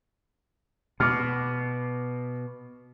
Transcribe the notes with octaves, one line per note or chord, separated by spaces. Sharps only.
B2 D6 F6